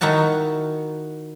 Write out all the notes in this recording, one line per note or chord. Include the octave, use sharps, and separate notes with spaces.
D#3 D#4 E4 F#4 A5